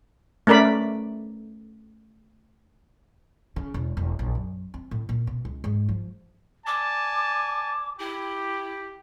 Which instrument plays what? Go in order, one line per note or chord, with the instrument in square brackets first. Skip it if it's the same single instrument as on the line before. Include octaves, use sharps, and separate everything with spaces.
[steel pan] A3 C#4 A#4 D5 B5
[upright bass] C#3
E1
E1
A#1
F#2
C4
A2
A#2
B2
C#2
G#2
F3
[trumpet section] D5 G#5 A5 [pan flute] D6
[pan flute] E4 [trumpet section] G4